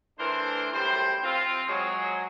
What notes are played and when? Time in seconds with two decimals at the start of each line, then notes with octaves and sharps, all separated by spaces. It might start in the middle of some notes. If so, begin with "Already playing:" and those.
0.18 E3 A3 D4 A#4 C5
0.72 F#2 A2 G3 C5
1.22 C4 F4
1.67 F#3 G#3 G#4